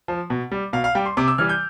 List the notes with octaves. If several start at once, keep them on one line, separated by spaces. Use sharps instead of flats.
F3
B2
G3
B2 F5
F5
G3 G5
C6
C3 D6
E6
E3 G3 F6
G6